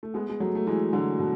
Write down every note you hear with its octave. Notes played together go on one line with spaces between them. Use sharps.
A3
G#3 B3
G#3
F#3 A3
A3
E3 G#3
D3 F#3
B2